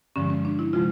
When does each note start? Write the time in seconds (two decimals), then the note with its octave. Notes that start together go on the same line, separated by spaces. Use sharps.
0.16 G2 D3 F3 G#3 C#4
0.30 C#4
0.45 D4
0.59 E4
0.73 C3 F3 G#3 F4